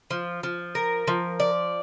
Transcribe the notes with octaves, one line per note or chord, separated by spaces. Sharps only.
F3
F3
A#4
F3
D5